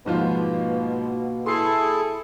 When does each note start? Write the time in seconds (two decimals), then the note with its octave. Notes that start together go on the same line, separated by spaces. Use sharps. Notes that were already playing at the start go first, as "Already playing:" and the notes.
0.06 G#2 B2 F3 A#3 F4
1.46 E4 G#4 A4 C6 C7